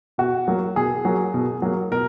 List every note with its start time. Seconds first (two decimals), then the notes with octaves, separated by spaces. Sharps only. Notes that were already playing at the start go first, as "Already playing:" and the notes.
0.18 B2 F#4
0.48 F#3 A#3
0.76 B2 G#4
1.05 F#3 A#3
1.34 B2
1.62 F#3 A#3
1.91 B2 A#4